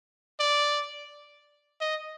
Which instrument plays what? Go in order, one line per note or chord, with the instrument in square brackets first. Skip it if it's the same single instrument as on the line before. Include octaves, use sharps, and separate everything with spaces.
[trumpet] D5
D#5